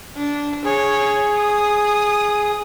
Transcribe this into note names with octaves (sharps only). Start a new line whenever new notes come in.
D4
G#4 C#5
D#6